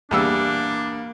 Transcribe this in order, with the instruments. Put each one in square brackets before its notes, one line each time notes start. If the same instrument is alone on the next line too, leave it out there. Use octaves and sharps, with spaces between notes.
[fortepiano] E2 G3 E6 [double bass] A#3 [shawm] D4